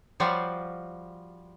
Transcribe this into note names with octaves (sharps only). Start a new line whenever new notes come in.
F3 G3 F4 F#4